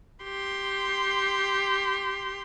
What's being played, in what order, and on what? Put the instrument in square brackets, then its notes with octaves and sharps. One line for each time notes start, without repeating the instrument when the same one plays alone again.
[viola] G4 C6